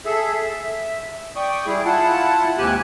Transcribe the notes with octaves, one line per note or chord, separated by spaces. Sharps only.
G#4 A4 E5
E5
D5 G5 C#6 D#6
G3 E4 G#4
E4 F4 F#5 A5
D#2 G#2 C3 G4 G#5 F#6